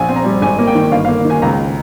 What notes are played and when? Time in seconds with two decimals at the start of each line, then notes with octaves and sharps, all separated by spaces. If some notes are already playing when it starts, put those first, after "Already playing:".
Already playing: A#1 G#5
0.09 C4
0.16 A#5
0.24 G3
0.42 G#1 G#5
0.59 A#3
0.67 G5
0.75 D#3
0.92 G1 F5
1.05 A#3 F5
1.25 D#3
1.30 G#5
1.42 C#2 A#5